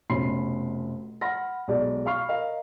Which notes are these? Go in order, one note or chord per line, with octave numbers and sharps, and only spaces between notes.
F1 B2 C#4 B5 C6 C7
F#5 B5 F6 A#6
B1 G#3 D5
F5 B5 C#6 F6 C7
A#4 D#5 F5